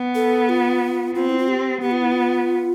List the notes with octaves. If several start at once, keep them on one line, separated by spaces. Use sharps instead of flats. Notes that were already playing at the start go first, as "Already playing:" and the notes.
Already playing: B3
A4
F4
C4 F4
E4
F4
G4
B3 G4
F4
E4
F4